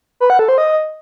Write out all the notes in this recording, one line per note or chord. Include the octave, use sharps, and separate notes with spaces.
B4
F#5
A4
C5
D#5